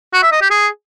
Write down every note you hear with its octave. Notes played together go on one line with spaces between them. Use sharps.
F#4
E5
D#5
G4
G#4